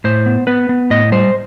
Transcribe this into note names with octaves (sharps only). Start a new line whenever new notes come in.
A2 C5
B3
B3 B4
B3
A2 D#5
G3 C5